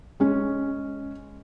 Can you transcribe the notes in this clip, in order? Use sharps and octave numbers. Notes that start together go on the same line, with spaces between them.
G#3 C#4